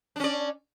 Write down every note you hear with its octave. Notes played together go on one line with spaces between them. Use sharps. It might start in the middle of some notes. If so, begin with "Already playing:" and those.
C#4 D4 D5